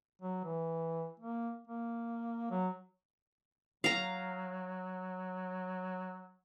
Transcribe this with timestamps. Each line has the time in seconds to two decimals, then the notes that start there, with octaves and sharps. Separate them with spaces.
0.22 F#3
0.44 E3
1.20 A#3
1.68 A#3
2.51 F#3
3.84 F#3 F5 A#5